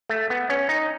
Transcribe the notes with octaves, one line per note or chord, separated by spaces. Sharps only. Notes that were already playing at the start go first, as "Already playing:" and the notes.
A3
B3
C#4
D#4